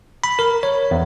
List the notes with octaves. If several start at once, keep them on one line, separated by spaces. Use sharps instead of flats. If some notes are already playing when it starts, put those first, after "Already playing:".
B5
A#4
C#5
E2